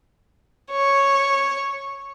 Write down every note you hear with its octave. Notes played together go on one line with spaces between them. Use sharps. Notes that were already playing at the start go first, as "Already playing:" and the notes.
C#5